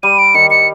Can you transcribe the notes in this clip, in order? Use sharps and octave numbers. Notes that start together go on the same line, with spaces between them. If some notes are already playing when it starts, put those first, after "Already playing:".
G3 D#7
D7
D#3 C#7
C#7